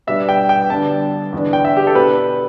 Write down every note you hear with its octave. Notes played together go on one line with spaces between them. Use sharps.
B2 G3 B3 D4 E5
G5
G5
D3 G3 B3 D4 A5
E2 D3 B3 D4
G5
E5
G4
A4
B2 B3 D4 B4